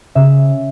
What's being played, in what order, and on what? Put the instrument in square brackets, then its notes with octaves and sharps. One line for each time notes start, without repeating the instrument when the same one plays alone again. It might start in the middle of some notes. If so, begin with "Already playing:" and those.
[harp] C#3 E5